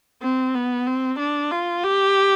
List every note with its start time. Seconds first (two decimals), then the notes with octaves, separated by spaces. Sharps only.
0.22 C4
0.55 B3
0.87 C4
1.19 D4
1.51 F4
1.83 G4